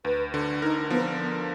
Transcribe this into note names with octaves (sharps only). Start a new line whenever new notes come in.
D2 B4
D3
D#4 A#4
F3 B3